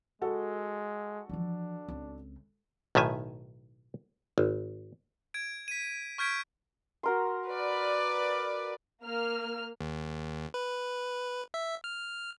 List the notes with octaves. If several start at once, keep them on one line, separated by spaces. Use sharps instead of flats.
G#3 F#4 A4
E3 F3 D4
C#2 C4
B1 A2 D#3 E5 G#5
G#1
G#6 D7
B6 D#7
C#6 F6 G6 G#6 B6 D7
F#4 A#4 C6
B4 D5
A#3 F6
D#2
B4
E5
F6